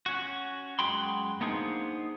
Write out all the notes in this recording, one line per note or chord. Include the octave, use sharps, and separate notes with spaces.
C#4 F#4
F#2 G#3 F#4 G5 B5 C6
A#3 B3 D4 D#4 G#4 C5